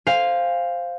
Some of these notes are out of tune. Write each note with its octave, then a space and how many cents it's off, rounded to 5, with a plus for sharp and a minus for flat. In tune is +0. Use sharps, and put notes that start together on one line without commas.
C5 +0 F5 +0 G#5 -30